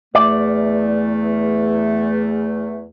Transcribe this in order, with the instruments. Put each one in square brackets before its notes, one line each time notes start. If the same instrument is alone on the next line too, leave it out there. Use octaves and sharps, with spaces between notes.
[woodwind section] E2 A3 [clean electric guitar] D5